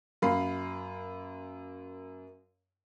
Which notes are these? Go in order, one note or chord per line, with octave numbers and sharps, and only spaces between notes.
F#2 A#3 F5 B5 C7